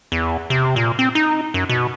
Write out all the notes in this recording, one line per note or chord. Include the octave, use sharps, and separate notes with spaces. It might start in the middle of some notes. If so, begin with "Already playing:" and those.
E2
C3
A#2
C4
D#4
F#2
B2